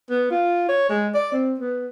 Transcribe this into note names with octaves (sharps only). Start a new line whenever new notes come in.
B3
F4
C#5
G#3
D5
C4
B3